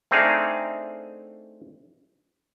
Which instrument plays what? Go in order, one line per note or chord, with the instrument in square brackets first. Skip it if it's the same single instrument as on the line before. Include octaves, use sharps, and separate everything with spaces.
[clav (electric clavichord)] A3 C4 D4 D#4 G#4 F5